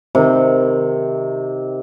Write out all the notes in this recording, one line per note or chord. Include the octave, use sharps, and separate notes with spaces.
C3 D#3